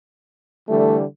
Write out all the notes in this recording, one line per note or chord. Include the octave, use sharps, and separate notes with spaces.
D3 E3 G3 A3